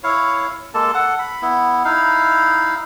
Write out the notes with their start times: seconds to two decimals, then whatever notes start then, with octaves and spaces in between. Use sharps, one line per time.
0.04 E4 C#5 F5
0.74 G#3 A#3 A4 A5
0.94 A4 F#5
1.19 B5
1.42 B3 E4
1.85 D#4 E4 F5